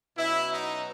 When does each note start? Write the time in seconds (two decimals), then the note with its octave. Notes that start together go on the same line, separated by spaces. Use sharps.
0.18 B2 F#3 C#4 E4
0.51 D#4